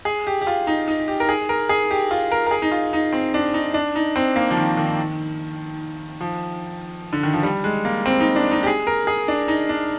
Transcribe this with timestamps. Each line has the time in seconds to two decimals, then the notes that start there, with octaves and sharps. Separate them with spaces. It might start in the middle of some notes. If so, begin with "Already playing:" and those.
0.05 G#4
0.27 G4
0.41 G4
0.47 F4
0.67 D#4
0.88 D#4
1.08 G4
1.20 A#4
1.29 G#4
1.49 A#4
1.69 G#4
1.91 G4
2.11 F4
2.32 A#4
2.47 A#4
2.51 G#4
2.62 D#4
2.72 F4
2.93 D#4
3.13 C4
3.34 D4
3.54 D#4
3.74 D4
3.95 D#4
4.16 C4
4.36 A#3
4.51 F3
4.57 D#3
4.77 D#3
6.21 F3
7.13 D3
7.23 D#3
7.34 F3
7.43 G3
7.64 G#3
7.85 A#3
8.06 C4
8.20 D#4
8.36 D4
8.51 D#4
8.63 G4
8.67 G#4
8.87 A#4
9.07 G#4
9.28 D4
9.48 D#4
9.69 D4